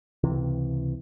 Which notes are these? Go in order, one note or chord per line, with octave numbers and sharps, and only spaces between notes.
C#2 C3 E3